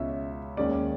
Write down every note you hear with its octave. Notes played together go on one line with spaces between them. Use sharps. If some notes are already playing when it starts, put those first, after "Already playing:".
Already playing: C#2 B2 G#3 C#4 E5
D#2 D#3 G#3 C#4 D5